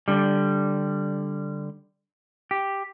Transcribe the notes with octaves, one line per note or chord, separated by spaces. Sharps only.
D3 G3
G4